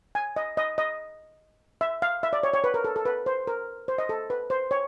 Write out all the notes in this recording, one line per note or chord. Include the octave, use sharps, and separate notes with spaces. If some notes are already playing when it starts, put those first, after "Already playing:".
G#5
D#5
D#5
D#5
E5
F5
E5
D5
C#5
C#5
B4
A#4
A4
A4
B4
C5
A#4
C5
D#5
A4
B4
C5
C#5